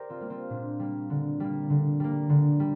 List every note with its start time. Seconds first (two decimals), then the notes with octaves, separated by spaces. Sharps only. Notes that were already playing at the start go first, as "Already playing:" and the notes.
Already playing: G4 A#4 C5 D5
0.10 C4 F4
0.20 G3 A#3
0.30 C4 F4
0.50 A#2 D4
0.79 G3 A#3
1.10 D3
1.40 G3 A#3
1.70 D3
2.00 G3 A#3
2.29 D3
2.60 G3